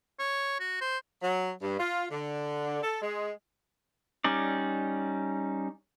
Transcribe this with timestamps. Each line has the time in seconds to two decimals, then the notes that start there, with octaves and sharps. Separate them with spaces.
0.19 C#5
0.60 F#4
0.81 C5
1.22 F#3
1.62 G2
1.79 F4
2.11 D3
2.83 A4
3.01 G#3
4.24 G3 C#4 D#4 D5